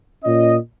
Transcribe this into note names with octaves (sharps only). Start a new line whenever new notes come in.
A#2 C#4 F4 D#5